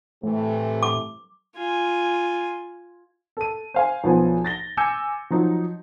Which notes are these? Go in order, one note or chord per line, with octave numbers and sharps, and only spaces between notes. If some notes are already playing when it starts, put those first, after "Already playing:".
A2 C3 E3 A3
D6
F4 G#5
A4 D#7
C5 F5 G#5
B1 F3 B3 C5 G#5
A6 A#6 G7
G#5 D6 E6 G6 G#6 C#7
F3 F#3 D#4